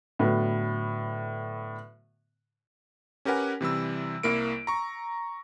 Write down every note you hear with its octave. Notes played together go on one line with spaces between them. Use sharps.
A2 D3 F#3 B3
C#4 G4 A#4 B4 F#5 G#5
C3 E3 G3 E6
C2 A#3 E4 A#4 D7
A#5 C#6